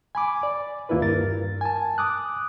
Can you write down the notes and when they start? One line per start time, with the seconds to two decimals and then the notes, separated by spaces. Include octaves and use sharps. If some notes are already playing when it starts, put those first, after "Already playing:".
0.15 G#5 B5 D6
0.43 D5
0.89 D#2 A#3 E4 F4 B4
1.02 G2 A#4 A6
1.61 G#5 A5
1.98 D6 D#6 F#6